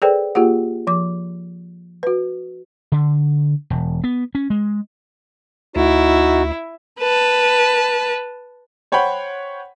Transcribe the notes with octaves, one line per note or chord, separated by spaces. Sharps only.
G#4 A4 B4 C5 D5 G5
A#3 F4 G4 G#4 F#5
F3 D6
F#4 B4
D3
E1
B3
C#4
G#3
D2 D#4 E4 F#4
B4 A5
C5 C#5 F#5 G5 B5